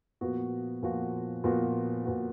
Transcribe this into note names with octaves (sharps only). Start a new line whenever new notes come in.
A#2 F3 B3 F#4
A#2 F3 B3 F#4
A#2 F3 B3 F#4
A#2 F3 B3 F#4